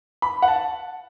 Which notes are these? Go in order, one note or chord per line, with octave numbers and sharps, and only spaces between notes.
B5
F#5
A5